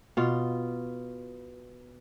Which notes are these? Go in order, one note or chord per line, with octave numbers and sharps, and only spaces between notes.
B2 F4